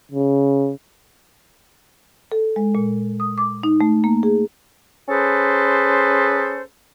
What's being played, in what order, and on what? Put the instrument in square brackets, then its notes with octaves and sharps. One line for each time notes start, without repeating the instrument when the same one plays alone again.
[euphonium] C#3
[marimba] A4
G#3
A#2
D#6
D6
D#4
A3
A#3
G#4
[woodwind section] C#4 G#4 A4 B4 C5